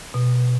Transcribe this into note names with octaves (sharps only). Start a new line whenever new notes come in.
B2